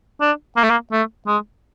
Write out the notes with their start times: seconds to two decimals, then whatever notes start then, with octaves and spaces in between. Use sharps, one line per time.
0.21 D4
0.56 A#3
0.63 A3
0.70 A#3
0.92 A3
1.27 G#3